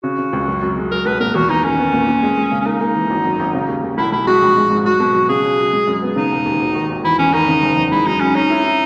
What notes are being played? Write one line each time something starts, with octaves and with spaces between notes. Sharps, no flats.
C#3 F#4
C#3
C#2
F#2
F#2
G#3
F#3 A#4
B1 B4
A#2 A#4
E2 F#4
E2 D#4
D#3 C#4
B3
A#2
A#2
G#3
G#3
C#3
C#4
A#3 D#4
A#3
E3
G#1
F#2
G#1
C#3
D#2
D#2
B1 E4
B1 E4
G#3 F#4
A#1
G#3
G#2
F#3 F#4
B2
F#3
C#3 G#4
F#3
F#3
G#3
F#2
B3
C#3 D#4
E1
D#2
G#1
D#3
G#1
E2 E4
E2 C#4
D#3 D#4
C#3
F#1
E2
G#3 E4
F#2 D#4
F#2 C#4
C#4 D#4
E4
E4